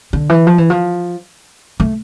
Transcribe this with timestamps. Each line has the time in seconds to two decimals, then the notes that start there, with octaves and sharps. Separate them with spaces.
0.13 D3
0.29 E3
0.47 F3
0.58 E3
0.70 F3
1.80 A3